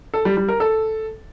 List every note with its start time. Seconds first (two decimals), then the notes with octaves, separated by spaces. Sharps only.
0.14 A4
0.25 G3
0.37 G3
0.49 A#4
0.60 A4